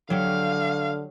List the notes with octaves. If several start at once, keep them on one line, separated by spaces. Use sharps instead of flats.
D3 F#3 G4 C#5 F5